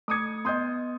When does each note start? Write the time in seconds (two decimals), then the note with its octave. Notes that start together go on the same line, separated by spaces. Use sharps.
0.08 A3 D6 D#6 G#6 C#7
0.45 B3 D#5 C6 D#6 G6